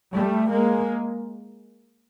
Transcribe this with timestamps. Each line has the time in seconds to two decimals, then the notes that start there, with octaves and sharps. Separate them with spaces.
0.13 G3 A3
0.50 G#3 A#3